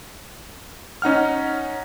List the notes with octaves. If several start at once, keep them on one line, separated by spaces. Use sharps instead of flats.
C#4 D#4 F#5 F6